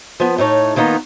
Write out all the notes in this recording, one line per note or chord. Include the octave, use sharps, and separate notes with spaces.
F3 B3
A2 D#4 C#5 A5
D#3 A#3 B3 D#4 F4